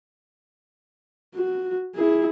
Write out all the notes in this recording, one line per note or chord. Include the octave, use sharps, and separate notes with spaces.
F#4
E4 G#4